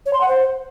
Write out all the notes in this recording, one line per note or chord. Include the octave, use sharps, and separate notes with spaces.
C#5
C6
F#5
C5